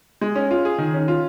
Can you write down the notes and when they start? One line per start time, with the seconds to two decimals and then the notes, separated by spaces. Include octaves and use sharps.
0.21 G#3
0.36 C#4
0.51 F4
0.65 G#4
0.78 D#3
0.94 C#4
1.08 F4